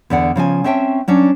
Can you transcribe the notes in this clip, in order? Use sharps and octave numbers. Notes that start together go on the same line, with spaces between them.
E2 D3 D5 F#5
C#3 F3 D#5 G#5
C4 C#4 E5 G5 A5
F#3 C#4 D4